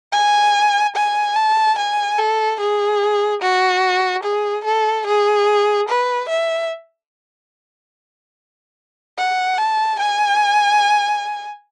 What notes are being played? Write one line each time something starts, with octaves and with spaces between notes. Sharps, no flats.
G#5
G#5
A5
G#5
A4
G#4
F#4
G#4
A4
G#4
B4
E5
F#5
A5
G#5